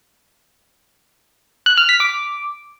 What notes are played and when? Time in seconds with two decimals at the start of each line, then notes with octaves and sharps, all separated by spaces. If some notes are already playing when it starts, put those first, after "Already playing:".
1.66 F#6
1.78 F6
1.89 B6
2.00 D6